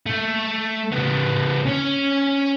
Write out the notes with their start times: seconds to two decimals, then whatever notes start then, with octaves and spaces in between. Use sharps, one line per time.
0.06 A3
0.92 C#3 B3
1.66 C#4 C#5